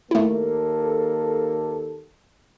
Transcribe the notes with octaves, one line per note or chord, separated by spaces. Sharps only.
D#2 A3 A#3 E4 A4